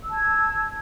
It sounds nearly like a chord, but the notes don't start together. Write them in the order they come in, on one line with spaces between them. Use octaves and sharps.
E6 A5 G#6